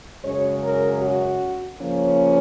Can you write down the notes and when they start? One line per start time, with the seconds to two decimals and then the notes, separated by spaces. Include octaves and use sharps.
0.23 F#2 C#3 G#3 C#4 C#5
0.62 A#4
1.01 F#4
1.79 C#3 F3 A#3 C#4